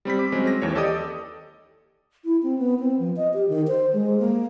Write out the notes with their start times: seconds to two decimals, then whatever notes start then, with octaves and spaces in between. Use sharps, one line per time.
0.05 G3 C4 B5 B6
0.19 D6
0.32 F#3 G#3 C4 C#4
0.47 A#6
0.62 D#2 E3 C#5
0.75 G4 A4 D5 D#5 D6 D#6
2.24 E4
2.43 C4
2.59 B3
2.80 C4
2.99 F3
3.17 D#5
3.34 G4
3.49 D#3
3.68 C5
3.93 G#3
4.20 A#3